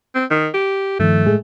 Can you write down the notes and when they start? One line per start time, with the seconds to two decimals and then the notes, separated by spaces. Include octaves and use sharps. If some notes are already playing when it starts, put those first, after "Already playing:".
0.15 C4
0.30 D#3
0.54 G4
0.99 G2 D#3 F3 A3
1.27 A2 G#3 G#4